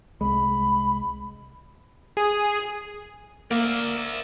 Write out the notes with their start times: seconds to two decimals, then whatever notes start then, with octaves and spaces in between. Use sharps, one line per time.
0.21 C2 G#3 B5
2.17 G#4
3.51 A#3 D5 E5